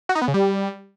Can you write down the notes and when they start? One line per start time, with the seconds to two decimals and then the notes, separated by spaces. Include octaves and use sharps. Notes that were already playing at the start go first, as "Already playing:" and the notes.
0.09 F#4
0.15 D#4
0.22 B3
0.28 C#3
0.34 G3